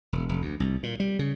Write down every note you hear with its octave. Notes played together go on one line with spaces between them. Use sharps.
E1
F1
D2
C2
A#2
G3
C#3